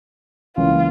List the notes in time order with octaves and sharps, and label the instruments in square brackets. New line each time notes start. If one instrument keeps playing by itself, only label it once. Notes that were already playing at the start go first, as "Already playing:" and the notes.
[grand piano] C#2 C#3 E3 A#3 C#4 [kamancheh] F4